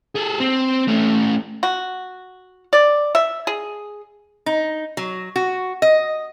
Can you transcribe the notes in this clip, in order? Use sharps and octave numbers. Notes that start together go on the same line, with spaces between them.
G#4 A4
C4
A3 C#4
F#4
D5
E5
G#4
D#4
F#3
F#4
D#5